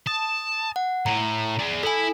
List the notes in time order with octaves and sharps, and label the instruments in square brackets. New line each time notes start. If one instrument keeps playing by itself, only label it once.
[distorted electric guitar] A5 [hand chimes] D#6
[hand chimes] F#5
[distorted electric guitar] A2 [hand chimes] A#5
[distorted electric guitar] G#4 D5
[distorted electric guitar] E4 [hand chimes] A4 G#5